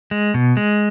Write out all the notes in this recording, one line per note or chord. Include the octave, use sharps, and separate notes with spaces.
G#3
B2
G#3